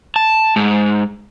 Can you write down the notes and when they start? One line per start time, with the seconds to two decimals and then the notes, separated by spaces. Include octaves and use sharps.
0.16 A5
0.56 G#2